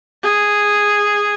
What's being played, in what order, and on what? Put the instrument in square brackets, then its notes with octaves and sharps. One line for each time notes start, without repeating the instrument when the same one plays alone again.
[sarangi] G#4